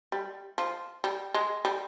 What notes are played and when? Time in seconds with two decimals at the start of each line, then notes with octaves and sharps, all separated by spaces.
0.12 G3
0.58 F3
1.04 G3
1.34 G#3
1.65 G3